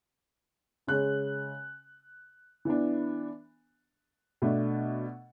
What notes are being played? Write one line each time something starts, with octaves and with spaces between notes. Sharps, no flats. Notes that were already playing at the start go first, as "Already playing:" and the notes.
C#3 G#3 C#4 F#6
E3 B3 D4
B2 A3 D4